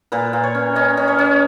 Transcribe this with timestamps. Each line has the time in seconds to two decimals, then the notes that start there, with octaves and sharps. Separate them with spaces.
0.12 A#2 B4
0.33 A#2
0.43 C#5
0.55 C#4
0.75 C#4 D#5
0.97 C#4
1.08 C#5
1.19 C#4